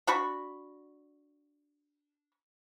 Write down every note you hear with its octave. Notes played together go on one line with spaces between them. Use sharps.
D4 F#4 B5 C#6